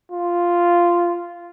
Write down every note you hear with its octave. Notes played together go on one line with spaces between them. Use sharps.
F4